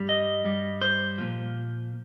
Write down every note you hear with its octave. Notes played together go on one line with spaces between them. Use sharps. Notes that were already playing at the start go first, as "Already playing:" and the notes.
Already playing: G2 G3
D#5
G2 G3
C5
A#2 F3